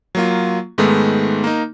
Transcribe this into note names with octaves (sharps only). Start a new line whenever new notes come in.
F#3 A#3 F4
G#2 D#3 G#3 A3 B3
A#3 D#4